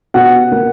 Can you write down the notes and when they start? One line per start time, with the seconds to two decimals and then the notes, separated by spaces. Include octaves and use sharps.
0.14 B2 F#5
0.52 A#3